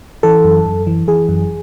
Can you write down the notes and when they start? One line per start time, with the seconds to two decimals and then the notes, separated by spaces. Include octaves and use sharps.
0.23 E3 A4
0.44 F#2
0.66 F#2
0.87 E3
1.08 E3 G#4
1.29 F#2